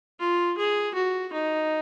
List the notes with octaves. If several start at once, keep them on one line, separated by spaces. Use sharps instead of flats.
F4
G#4
F#4
D#4